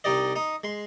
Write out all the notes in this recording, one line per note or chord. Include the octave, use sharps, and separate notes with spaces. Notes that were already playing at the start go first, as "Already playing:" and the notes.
C2 D#4 G4 D5 D#5
D#4 D#6
G#3 C6